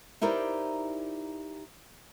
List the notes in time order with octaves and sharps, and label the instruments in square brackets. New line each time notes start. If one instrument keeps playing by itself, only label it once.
[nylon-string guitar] D#4 E4 G4 A#4 C5 D5